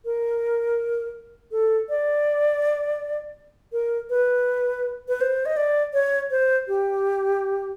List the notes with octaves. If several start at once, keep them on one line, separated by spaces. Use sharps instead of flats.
A#4
A4
D5
A#4
B4
B4
C5
D#5
D5
C#5
C5
G4